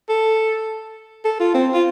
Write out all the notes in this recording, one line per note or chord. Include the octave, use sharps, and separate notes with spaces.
A4
A4
F4
C4
F4